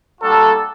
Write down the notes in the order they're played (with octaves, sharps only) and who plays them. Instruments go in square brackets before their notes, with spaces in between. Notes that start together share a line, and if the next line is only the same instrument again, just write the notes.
[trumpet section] G3 A#3 D4 F#4 A4